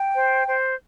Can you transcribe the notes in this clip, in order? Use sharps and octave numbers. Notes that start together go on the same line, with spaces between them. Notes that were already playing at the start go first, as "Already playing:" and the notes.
Already playing: G5
C5
C5